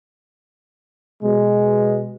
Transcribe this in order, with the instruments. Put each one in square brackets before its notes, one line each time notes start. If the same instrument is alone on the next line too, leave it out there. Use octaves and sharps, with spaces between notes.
[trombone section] B2 G#3